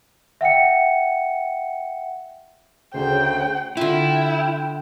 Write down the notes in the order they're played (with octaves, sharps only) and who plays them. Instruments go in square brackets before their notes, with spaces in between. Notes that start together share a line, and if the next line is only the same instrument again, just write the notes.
[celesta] E5 F#5 G5 C#7
[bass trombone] D2 [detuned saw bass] C#3 [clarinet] C5 [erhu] G5
[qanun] D3 F4 [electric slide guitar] E4 [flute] G5